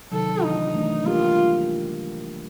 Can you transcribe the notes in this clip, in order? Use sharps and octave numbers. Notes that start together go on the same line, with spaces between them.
C3 D#3 F#3 A4
E3 A3 D4 D#4
E3 A3 D4
G3 A#3 D4 F4 G4 A#4